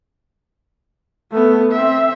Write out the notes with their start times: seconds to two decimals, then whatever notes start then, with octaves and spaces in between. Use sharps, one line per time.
1.32 A3 B3
1.72 C4 E5